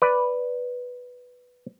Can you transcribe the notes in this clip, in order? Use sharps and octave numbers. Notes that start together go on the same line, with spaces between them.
B4 D5